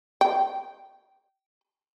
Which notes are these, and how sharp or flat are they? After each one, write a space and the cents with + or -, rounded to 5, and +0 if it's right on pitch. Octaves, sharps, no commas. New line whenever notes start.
G5 -20